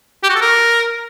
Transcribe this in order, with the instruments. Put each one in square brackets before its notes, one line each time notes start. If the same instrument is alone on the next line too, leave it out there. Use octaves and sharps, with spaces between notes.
[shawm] G4
F#4
A4
A#4